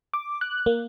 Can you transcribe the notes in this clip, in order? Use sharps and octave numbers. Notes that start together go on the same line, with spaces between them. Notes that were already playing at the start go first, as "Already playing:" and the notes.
D6
F#6
A#3